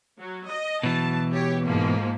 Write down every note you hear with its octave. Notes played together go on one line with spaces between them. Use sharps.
F#3
D#5
B2 E3 F#3 A5
G4 C#5
G#2 F3 A#3